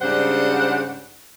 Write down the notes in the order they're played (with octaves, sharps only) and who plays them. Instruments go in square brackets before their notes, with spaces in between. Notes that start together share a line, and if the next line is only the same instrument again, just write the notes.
[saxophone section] G#2 C#3 G3 D4 C5 F#5